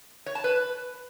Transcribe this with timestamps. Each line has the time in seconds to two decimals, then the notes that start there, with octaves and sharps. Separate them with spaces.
0.26 C#5
0.35 A5
0.44 B4